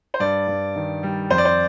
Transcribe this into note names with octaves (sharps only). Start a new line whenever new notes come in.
C5
G2 D5
G2
D#3
G3
F2 C5
D5
C5